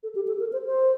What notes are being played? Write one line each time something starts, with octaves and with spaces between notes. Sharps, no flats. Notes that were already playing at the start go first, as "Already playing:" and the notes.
A4
G4
A4
A#4
C5
C5